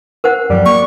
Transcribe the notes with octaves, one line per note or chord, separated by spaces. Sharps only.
A#4 C5 F#5
F#2 F3 G3
A#3 C#6